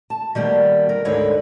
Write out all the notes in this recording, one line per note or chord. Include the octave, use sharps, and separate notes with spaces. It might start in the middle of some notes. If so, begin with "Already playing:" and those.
A5
D#3 G3 A#3 B3
A#4
D2 G#2 D3 D#4 B4 C#5